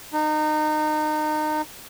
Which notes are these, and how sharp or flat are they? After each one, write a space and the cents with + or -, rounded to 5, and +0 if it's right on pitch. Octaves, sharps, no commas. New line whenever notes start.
D#4 -25